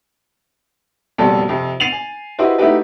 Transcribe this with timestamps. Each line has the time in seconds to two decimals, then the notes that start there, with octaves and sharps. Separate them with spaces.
1.18 F#1 F2 B2 G3 A4
1.48 F2 C3
1.80 A6 C7 D#7 F7 F#7
1.92 G#5
2.38 E4 F#4 G4 B4 C5 D#5
2.58 A3 D#4 E4 F#4 G4 B4